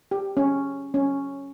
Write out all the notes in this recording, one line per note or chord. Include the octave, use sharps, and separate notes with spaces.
G4
C#4
C#4